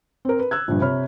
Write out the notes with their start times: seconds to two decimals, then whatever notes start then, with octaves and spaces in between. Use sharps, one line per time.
0.25 C4 A#4
0.39 B4
0.51 E6 F#6 G#6
0.68 A#1 G2
0.81 C3 C#5 B5 F6